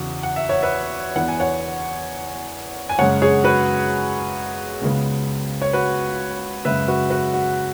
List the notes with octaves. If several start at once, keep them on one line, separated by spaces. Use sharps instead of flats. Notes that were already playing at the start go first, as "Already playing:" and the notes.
Already playing: E2 C#3 E3 F#4
F#5
E5
C#5
B4 E5
E2 E3 B3 F#5
G#5
C#5 F#5
G#5
F#2 C#3 G#3 C#5 F#5
G#4 C#5
F#4 B4
C#2 C#3 G#3 B3
C#5
F#4 B4
F#2 C#3 G#3 B4 E5
F#4 B4
F#4 B4
F#4